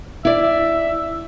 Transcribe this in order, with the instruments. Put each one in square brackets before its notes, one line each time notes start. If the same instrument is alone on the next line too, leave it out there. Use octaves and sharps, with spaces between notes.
[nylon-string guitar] E4 D5 [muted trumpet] E5